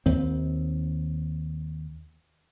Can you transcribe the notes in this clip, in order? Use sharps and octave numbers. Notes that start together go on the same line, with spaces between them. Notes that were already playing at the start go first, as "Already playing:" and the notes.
D#2 C4